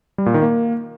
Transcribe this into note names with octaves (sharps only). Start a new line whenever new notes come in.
G3
A#2
D#3
A#3